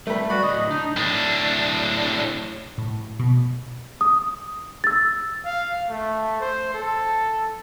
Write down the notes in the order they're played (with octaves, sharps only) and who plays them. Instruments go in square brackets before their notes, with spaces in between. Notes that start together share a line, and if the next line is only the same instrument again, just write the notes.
[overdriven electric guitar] G3 [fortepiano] A3 B4
[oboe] F#4 [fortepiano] D5 [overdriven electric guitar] B5
[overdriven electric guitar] D2 A2 [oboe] D#5
[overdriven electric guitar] D4 [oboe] D#4
[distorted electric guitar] A2 D4
[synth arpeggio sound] A2
B2
[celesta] D#6
E6 A6
[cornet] F5
A3
C5
A4